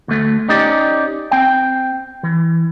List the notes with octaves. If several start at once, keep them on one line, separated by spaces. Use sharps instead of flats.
D2 A3
C#4 D#4 G4 D5
C4 G5
E3